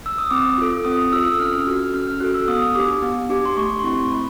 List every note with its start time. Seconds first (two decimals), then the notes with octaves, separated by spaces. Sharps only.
0.06 E6
0.18 D#6
0.31 C4 D6
0.58 F4 A4
0.85 C4 D#6
1.12 F4 A4 E6
1.24 D#6
1.32 E6
1.40 C#4 F6
1.67 F#4 A4 F6
1.94 C#4 F6
2.07 F6
2.20 F#4 A4 F#6
2.34 E6
2.48 B3 D#6
2.75 D4 G4 D6
3.02 B3
3.29 D4 G4 D6
3.45 C6
3.57 A3 C#6
3.79 C6
3.84 C4 E4 C#6
4.11 A3 B5